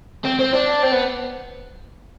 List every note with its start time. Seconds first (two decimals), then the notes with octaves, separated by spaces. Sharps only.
0.25 C4
0.39 C4
0.54 D4
0.83 C4
0.92 B3